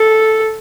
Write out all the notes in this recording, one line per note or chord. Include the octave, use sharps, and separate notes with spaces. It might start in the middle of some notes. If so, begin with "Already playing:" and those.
Already playing: A4